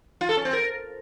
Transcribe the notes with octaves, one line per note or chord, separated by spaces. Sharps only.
F4
A4
C#4
C4
A#4